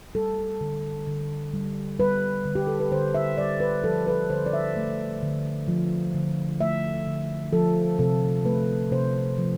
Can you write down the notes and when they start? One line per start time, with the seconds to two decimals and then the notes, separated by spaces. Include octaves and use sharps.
0.15 G3 A4
0.61 D3
1.07 D3
1.54 G3
2.00 G3 B4
2.45 D3
2.55 G4
2.67 A4
2.80 B4
2.92 D3 C5
3.14 E5
3.38 G3 D5
3.60 B4
3.84 F3 A4
4.07 B4
4.30 D3 C5
4.46 D5
4.53 E5
4.76 A3
5.23 D3
5.68 F3
6.15 D3
6.61 A3 E5
7.07 D3
7.53 F3 A4
7.99 C3 A4
8.45 A3 B4
8.91 C3 C5
9.38 F3